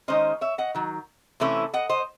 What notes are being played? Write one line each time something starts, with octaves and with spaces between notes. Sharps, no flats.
D#3 G#3 C#4 C5 D#5
C#5 E5
D#5 F#5
D#3 F#3
C3 E3 A3 C#4 E4
D#5 F#5
C5 D#5